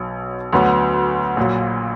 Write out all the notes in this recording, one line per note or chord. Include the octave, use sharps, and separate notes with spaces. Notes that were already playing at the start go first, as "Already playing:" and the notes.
Already playing: B1 B2 F#3
D2 D3 F#3 B3 F#4
A#1 A#2 F#3